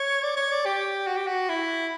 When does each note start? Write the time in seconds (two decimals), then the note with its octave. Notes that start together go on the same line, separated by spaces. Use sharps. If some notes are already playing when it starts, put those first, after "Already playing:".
Already playing: C#5
0.23 D5
0.36 C#5
0.51 D5
0.65 G4
1.07 F#4
1.17 G4
1.27 F#4
1.49 E4